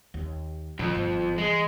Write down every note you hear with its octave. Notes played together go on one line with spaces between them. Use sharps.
D#2
F2 A#2 F3 F#3
G1
E3 G#3